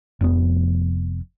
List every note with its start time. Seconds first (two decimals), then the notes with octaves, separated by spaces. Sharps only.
0.21 F1 F2 A#2 B3